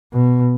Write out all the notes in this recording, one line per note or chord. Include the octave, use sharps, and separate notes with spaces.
B2